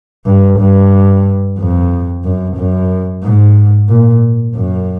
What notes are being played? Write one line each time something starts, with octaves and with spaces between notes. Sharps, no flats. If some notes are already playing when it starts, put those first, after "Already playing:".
G2
G2
F2
F#2
F#2
G#2
A#2
F#2